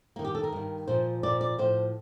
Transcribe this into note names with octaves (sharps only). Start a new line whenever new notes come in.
G2 D#3 A#3
G4
A4
A#4
G2 D#3
A#2 F3 C5
A#2 F3 D5
D5
A2 F3 C5